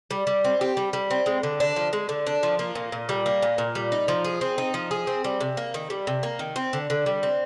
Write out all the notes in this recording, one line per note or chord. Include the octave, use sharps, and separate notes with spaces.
G3
G3
C4
G4
G3
G3
C4
G#3
D3
D4
F3
G#3
D3
D4
F3
A#3
A#2
A#2
G3
A#3
A#2
A#2
G3
D#4
F3
G#4
C4
D#4
F3
G#4
C4
G3
C3
A#3
D#3
G3
C3
A#3
D#3
C4
D3
D3
G3
C4